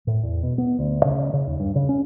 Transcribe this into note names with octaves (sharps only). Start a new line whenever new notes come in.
A2
E2
B2
B3
D2
C#3
C#3
D#2
G2
C#3
C#4